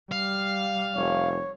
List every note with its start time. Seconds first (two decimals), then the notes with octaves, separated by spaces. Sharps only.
0.12 G3 F5
0.96 F1 C#5